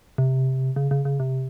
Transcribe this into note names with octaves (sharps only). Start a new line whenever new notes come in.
C3
C#3
C#3
C#3
C3